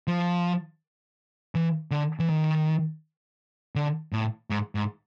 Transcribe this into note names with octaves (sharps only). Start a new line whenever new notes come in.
F3
E3
D3
E3
D#3
D3
A2
G#2
G#2